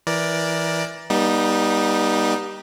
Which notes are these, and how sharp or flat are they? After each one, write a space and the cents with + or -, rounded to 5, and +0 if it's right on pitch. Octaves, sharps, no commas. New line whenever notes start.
E3 +0 A#4 +20 D5 +0
G3 +0 B3 -45 D#4 +0